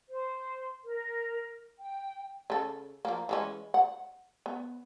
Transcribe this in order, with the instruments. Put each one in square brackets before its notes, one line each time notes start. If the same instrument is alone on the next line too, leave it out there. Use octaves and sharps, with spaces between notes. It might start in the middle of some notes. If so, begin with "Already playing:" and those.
[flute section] C5
A#4
G5
[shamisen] C#3 A4
F3 A#3
E3 G#3 C#4
F#5
B3